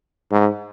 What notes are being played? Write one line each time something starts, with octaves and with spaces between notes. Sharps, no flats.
G#2